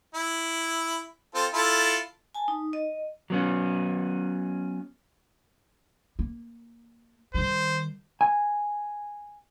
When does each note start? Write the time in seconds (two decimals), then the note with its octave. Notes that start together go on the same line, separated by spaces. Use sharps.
0.14 E4
1.34 C4 F4 A4
1.53 E4 F4 A4
2.35 G#5 A5
2.48 D#4
2.73 D#5
3.30 F#3 B3 C#4
6.19 A#3
7.34 D#3 G3 C5
8.21 G#5